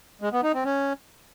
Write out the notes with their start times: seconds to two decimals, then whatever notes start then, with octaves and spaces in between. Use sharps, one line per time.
0.21 G#3
0.32 B3
0.43 D#4
0.54 C4
0.65 C#4